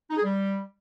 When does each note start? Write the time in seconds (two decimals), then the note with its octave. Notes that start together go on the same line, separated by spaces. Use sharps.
0.10 D#4
0.17 G#4
0.23 G3